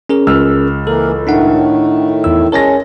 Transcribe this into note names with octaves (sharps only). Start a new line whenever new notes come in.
C#4 G#4 A#4
C#2 E6 F6
E3 A#3 A4 A#4
A2 D#3 A3 D4 D#4 F#5
E2 E4 E6
G#3 C#4 A#4 C#5 G#5 A5 A#6